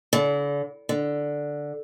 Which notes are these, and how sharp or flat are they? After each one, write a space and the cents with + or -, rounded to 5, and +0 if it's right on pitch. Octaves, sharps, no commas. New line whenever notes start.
D3 -40
D3 +0